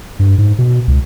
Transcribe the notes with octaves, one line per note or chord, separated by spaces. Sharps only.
G2
G#2
B2
C#2